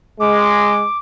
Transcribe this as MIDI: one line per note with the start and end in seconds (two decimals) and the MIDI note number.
0.20 0.86 56
0.20 0.98 86